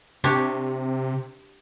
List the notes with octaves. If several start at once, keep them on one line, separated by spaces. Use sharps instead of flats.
C3 D4 G4 C#5